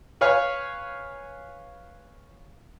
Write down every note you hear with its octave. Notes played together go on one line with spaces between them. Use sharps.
B4 C#5 F5 G#5